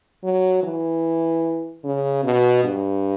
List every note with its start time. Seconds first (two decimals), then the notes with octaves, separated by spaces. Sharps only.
0.24 F#3
0.63 E3
1.84 C#3
2.24 B2
2.64 G2